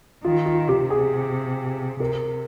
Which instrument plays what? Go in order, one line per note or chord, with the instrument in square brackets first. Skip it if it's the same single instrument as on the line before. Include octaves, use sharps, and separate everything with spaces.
[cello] D#3 [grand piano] F4
[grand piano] F4
[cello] C3 [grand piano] G4
[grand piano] G#4
[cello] C3 [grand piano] A#4